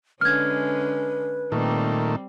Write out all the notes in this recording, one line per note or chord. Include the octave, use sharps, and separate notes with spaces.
D3 G#3 C#4 B4 F6 G#6
A#2 D#3 G3 A3 C4